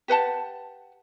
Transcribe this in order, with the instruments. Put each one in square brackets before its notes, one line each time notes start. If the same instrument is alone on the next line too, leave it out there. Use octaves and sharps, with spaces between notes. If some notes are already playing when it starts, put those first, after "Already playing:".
[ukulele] G4 B4 F#5 A5